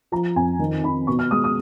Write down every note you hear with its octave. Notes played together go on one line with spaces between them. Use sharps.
F3 A#5
F2 G#5
D#3
D#3 B5
B2 C#6
F6
G#3 D#6
D#6